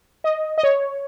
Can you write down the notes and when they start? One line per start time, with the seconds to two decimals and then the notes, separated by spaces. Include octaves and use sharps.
0.24 D#5
0.58 D#5
0.63 C#5